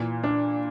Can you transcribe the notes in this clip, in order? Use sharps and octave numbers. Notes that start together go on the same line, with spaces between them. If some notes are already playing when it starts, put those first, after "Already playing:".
Already playing: A#2 E3
D4